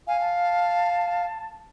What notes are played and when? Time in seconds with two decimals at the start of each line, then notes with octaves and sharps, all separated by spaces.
0.07 F5 G#5
0.21 A5